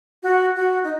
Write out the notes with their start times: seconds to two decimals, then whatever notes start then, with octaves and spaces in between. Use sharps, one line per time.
0.23 F#4
0.56 F#4
0.84 D#4